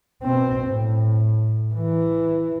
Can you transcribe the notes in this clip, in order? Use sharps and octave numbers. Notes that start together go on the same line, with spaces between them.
B2 C4
A2
E3